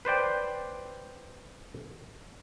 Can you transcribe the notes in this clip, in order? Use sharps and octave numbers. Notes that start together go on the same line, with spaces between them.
B4 C5 D5 G5